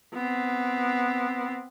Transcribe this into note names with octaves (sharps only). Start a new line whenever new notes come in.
B3 C4